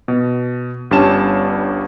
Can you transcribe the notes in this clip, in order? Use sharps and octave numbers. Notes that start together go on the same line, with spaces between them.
B2
G1 G2 G3 C#4 A5 E7